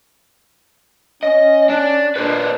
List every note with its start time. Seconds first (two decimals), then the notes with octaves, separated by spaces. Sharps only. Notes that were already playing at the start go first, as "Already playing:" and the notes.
1.23 C#4 D#5
1.69 D4 D5
2.16 A#2 D4 B4 C5 D5